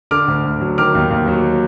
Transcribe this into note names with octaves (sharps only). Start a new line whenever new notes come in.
D3 D6 F6
D2
D2
F#3
D#3 D6 F6
D#2
D#2
F#3